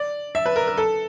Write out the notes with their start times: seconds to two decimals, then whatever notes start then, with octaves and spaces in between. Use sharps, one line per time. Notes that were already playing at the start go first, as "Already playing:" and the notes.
Already playing: D5
0.35 E5
0.46 B4
0.56 A#4
0.67 A#4
0.77 A4